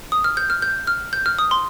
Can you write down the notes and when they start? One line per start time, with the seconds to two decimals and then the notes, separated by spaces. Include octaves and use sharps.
0.12 D#6
0.24 F6
0.37 G6
0.50 F6
0.62 G6
0.87 F6
1.13 G6
1.26 F6
1.39 D#6
1.51 C6